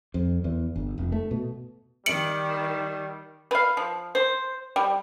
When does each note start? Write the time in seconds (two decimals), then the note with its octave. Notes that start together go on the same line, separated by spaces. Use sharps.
0.14 F2
0.44 E2
0.76 G1
0.98 F1
1.12 A3
1.31 B2
2.06 D#3 G3 C#7 D7 F#7
3.51 B4 F5
3.77 F3
4.15 C5
4.76 G3